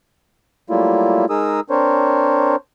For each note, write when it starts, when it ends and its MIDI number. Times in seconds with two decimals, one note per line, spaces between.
0.70 1.25 54
0.70 1.25 55
0.70 1.25 57
0.70 1.25 58
0.70 1.25 64
0.70 1.25 65
1.30 1.60 56
1.30 1.60 63
1.30 1.60 68
1.30 1.60 70
1.30 1.60 87
1.30 1.60 88
1.70 2.56 60
1.70 2.56 62
1.70 2.56 70
1.70 2.56 72
1.70 2.56 73